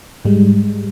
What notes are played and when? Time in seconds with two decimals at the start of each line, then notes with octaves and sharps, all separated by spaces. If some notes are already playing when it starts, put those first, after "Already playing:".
0.25 G#2 G3 G#3